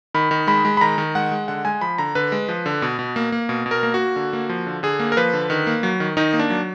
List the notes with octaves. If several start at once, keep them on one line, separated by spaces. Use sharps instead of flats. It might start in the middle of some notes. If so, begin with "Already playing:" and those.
D#3 B5
D#3
G#3 B5
G#3
B5
D#3 A#5
D#3
G#3 F#5
G#3
D3 F#5
G#3 G#5
F3 B5
D3 A#5
D3 B4
G#3
F3
D3
B2
B2
A#3
A#3
B2
B2
A#4
A#3
A#3 F#4
D3
A#3
F3
D3
D3 G#4
A#3
A#4
F3 B4
D3
D#3
A#3
F#3
D#3
D#3 D#4
A#3
D4
F#3